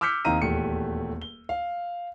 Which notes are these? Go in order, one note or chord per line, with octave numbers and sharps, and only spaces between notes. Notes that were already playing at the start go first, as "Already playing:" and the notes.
D6 E6 F6 G6 B6 C#7
D#2 C4 D#4 F5 A#5 D#7
D#1 E2 A3 G4 C#7
G7
F5